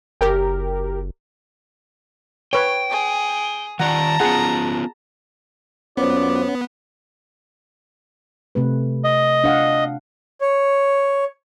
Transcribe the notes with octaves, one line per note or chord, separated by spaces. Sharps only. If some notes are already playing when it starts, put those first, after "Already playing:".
F#1 G4 A#4
B4 C#5 G5
G#4
D#3 F4 D5 F#5 A5 A#5
B3 C#4 F4 G#4 F#5
F#2 B3 C#4 F4 C5 D5
C3 A3 B4
D#5
D4 F5 F#5
C#5